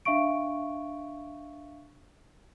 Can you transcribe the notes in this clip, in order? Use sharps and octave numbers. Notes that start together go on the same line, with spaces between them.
D4 E5 F5 C#6 D7